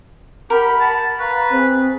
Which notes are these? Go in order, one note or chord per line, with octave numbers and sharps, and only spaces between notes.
G4 A#4 F#5 B5
A5
B4 F5 A#5 C#6
C4 G#4